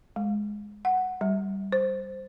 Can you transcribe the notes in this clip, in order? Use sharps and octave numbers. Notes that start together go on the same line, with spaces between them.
G#3
F#5
G3
C5